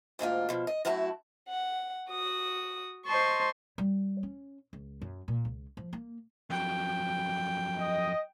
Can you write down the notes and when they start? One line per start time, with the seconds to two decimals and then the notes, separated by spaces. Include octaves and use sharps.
0.19 D2 G#2 A#3 F4
0.49 B2 F3
0.67 D#5
0.85 F#2 A2 E4 F#4 A5
1.48 F#5
2.09 F#4 D#6
3.06 C5 D#5 A5 C6 C#6
3.78 G3
4.23 C#4
4.73 C#2
5.02 F#2
5.28 A#2
5.45 C#2
5.77 F3
5.93 A#3
6.50 F2 F#3 G5
7.78 D#5